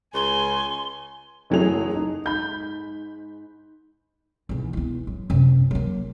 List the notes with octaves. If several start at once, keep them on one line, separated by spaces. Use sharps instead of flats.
C#2 G#5 C6
F#1 E3 F#3 A3 G#4 F7
D#4
G#2 B5 G6
B1 E2
B3 E4
F#3
F#2 C3
F#3 A#3